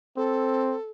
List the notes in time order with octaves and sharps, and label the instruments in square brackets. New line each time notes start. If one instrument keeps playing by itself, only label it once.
[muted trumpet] C4 [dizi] A4